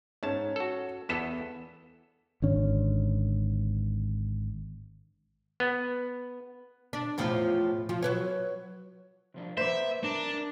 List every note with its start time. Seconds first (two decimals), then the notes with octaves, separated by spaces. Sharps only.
0.23 G#2 C#4 A5
0.56 F#4 A4
1.09 E2 B3 A4 B6 E7
2.42 G#1 D3 C#4
5.60 B3
6.93 D4
7.18 E2 A2 F3
7.89 F3 F4
8.03 F#3 B4 C#5
9.34 C3 F3 D4
9.57 A#3 B4 C5 D5 E5
10.04 D4 A#4